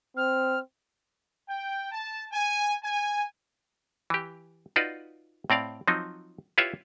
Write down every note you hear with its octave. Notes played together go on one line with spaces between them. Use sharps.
C4 F6
G5
A5
G#5
G#5
E3 G4
D#4 F4 F#4 B4 D5
A2 C4 D5 F5
F3 F#3 C4 D#4
E4 F4 G4 B4 C#5 E5